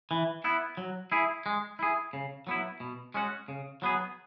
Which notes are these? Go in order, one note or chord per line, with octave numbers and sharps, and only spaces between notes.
E3
B3 E4
F#3
E4 G#4
G#3
E4 G#4
C#3
F#3 B3 E4
B2
G#3 C#4 F#4
C#3
F#3 B3 G#4